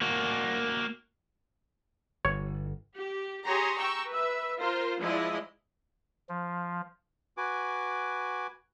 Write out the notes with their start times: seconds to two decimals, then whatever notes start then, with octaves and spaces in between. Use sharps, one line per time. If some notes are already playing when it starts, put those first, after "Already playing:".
0.01 A#3 F#4
2.25 G1 C#5
2.97 G4
3.45 G4 G#4 C#5 A#5 C6 D#6
3.77 G5 A#5 C#6 E6
4.09 B4 E5
4.60 F4 A#4 C5
5.02 F3 G#3 E4 D5 D#5
6.29 F3
7.37 F#4 B4 G#5 D6